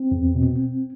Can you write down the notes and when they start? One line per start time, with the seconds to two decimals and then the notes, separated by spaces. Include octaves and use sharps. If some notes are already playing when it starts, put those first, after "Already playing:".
Already playing: C4
0.12 E2
0.35 B2